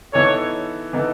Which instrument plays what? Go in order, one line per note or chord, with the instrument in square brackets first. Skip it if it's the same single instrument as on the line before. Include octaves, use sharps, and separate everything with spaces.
[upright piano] E3 B3 D#4 A4 [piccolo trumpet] C#5
[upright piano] E3 B3 D#4 A4